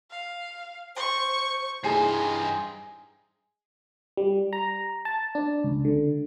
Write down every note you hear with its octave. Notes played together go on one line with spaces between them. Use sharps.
F5
C5 C#6
G2 D#4 E4 G#4 C5 G#5 C7
G3
A#5
A5
D4
C#2
D3